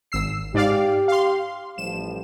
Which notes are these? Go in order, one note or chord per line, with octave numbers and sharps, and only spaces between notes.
G#1 E6 C7
G#2 G4 D5 F5
F5 C6
A1 F3 G3 E7